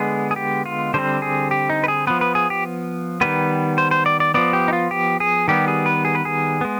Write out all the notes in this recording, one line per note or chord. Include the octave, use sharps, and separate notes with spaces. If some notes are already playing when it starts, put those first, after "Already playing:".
Already playing: D3 G#3 B3 G#4
G#4
G4
F4
D3 G3 C4 C5
G#4
G4
D#4
B4
G#4
F3 B3 B4
B4
G#4
G4
D#3 G3 B3 B4
C5
C5
D5
D5
F3 B3 D5
G4
D#4
F4
G4
G#4
D#3 G3 B3 G4
G#4
B4
G#4
B4
G#4
G#3 B3